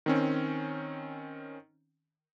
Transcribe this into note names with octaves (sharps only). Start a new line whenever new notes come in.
D#3 C4 C#4